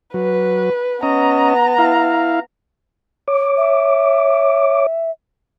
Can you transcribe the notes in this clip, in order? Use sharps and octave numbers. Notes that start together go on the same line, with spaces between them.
F#3 B4
B3 C#4 D#5 A#5
E4 F5
C#5 D6
E5